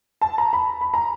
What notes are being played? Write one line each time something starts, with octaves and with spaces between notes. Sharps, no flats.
A5
A#5
B5
B5
A#5